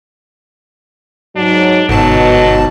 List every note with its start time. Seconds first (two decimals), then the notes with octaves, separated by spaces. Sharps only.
1.36 G#2 F#3 D4
1.89 G1 G#2 B2 F#3 A5